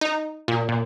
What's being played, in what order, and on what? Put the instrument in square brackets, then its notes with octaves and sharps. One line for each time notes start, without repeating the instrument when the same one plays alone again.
[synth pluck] D#4
A#2
A#2